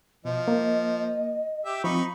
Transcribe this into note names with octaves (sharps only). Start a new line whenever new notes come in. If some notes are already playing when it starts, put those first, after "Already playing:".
B2 F3 D#5
A#3
G4 E5
F3 C4 D#4 B5 C#6